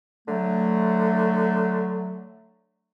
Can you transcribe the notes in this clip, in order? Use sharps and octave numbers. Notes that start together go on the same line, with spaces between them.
D3 F#3 A3